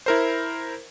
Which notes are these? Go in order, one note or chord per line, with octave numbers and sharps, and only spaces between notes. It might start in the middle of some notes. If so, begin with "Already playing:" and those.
E4 A#4 C5